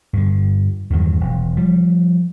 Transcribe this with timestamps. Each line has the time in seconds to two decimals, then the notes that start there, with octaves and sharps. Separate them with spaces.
0.13 G2 D3
0.90 E2 G2 D#3 F#3
1.20 E1
1.57 F3 G3